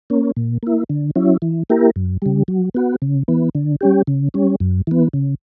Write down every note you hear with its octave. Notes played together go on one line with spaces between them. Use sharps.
A#3 C#4
A#2
A#3 E4
D3
F#3 C#4 E4
E3
A#3 E4 G4 A#4
F#2
C#3 G3
F#3
B3 F#4
C#3
E3 B3
D3
G3 C#4 G4
C#3
G3 C#4
F#2
E3 B3
C#3